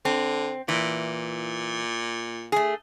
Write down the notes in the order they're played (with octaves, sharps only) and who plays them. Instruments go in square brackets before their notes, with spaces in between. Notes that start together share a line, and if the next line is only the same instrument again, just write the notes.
[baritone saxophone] D3 [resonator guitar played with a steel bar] C4
[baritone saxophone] A#2 [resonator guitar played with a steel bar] E3
[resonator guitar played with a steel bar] A3 G#4